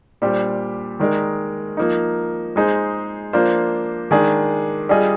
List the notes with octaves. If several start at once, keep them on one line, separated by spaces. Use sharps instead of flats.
A#2 G3 D4 G4 C5
D#3 G#3 D#4 A#4 D5
F3 A#3 D#4
G#3 D#4 G#4 C5
F3 A#3 D4 F4 C5
D#3 G#3 D4 G#4
G3 D4 F4 G#4 D#5